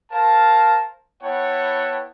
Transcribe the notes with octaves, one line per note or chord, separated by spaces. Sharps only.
A#4 C5 F5 A5
B3 E4 C#5 F#5 G5 A5